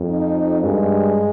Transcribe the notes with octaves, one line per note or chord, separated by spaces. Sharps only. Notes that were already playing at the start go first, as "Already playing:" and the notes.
Already playing: F2
D#4
G2 G#3